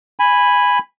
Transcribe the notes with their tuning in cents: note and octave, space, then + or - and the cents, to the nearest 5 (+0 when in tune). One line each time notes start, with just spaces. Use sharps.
G#5 -10 B5 +0